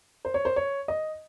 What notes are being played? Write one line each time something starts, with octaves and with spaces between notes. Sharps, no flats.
C5
C#5
C5
C#5
D#5